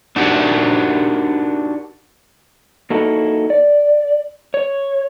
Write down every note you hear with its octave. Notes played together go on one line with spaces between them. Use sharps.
D4 D#4 F#4 G4 A#4
A#3 D#4 E4 F#4 A4
D5
C#5